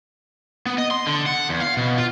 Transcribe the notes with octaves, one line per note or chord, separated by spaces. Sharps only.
B3
D#5
C6
D3
F#5
E2
F5
B2
F4